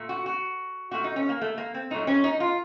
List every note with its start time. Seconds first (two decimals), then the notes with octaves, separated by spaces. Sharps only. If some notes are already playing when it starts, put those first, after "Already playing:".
Already playing: A#2 A3
0.09 F#4
0.26 F#4
0.91 A#2 A3 F#4
1.04 D#4
1.16 C#4
1.29 A#3
1.41 A3
1.58 A#3
1.74 C4
1.90 A#2 F#3 A3 D#4
2.07 C#4
2.24 D#4
2.40 F4